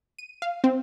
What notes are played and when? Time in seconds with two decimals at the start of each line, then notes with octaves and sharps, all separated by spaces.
0.19 D#7
0.42 F5
0.64 C4